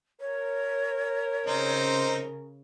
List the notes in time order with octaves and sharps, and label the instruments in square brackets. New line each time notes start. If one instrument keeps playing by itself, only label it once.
[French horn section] A#4 [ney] C#5
[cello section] C#3 [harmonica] C4 D#4 C5